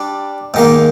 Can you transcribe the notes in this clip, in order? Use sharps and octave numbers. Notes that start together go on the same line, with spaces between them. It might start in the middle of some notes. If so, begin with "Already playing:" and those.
Already playing: G3 D4
G#2 D#3 A#3